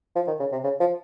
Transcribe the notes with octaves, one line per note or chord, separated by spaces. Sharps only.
F3
D#3
C#3
C3
C#3
F3